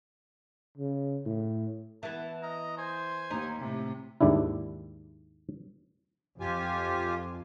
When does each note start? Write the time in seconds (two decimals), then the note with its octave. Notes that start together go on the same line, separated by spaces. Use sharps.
0.78 C#3
1.26 A2
2.03 E3 B3 A5
2.43 D#5 A#5
2.78 C5 G#5
3.30 D#2 D#4
3.59 A2 C3
4.21 D#2 G#2 G3 D4 E4
6.40 F2 F4 G4 G#5